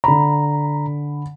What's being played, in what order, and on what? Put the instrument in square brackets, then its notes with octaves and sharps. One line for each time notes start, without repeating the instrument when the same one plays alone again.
[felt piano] D3 B5 [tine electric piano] A#5